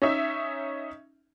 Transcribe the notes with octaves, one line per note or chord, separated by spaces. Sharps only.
C#4 D#4 E5